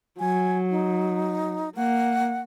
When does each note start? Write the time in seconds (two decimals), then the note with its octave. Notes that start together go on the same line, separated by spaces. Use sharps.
0.20 F#3 G#5
0.71 D#4
1.76 A#3 F#5